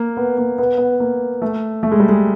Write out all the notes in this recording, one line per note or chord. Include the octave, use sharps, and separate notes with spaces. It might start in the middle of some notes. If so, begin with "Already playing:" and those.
Already playing: A#3
B3
A#3
B3
B3
A#3
A3
A3
G#3
G3
G#3